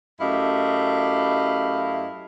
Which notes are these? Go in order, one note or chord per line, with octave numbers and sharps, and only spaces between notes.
F#2 A3 E4 G4 D#5 F5